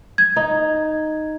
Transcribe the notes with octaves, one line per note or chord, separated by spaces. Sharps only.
G#6
D#4